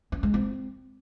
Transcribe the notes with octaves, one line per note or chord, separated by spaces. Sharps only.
C#4
G#3
C4